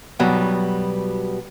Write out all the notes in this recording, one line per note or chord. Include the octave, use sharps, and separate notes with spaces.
B2 F#3 G3 B3